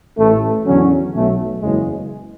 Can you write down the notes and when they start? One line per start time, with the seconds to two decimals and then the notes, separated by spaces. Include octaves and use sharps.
0.17 A1 A2 E3 A3
0.65 E2 D3 F#3 C#4
1.13 B1 B2 F#3 A3
1.61 F#1 E2 C#3 E3 G#3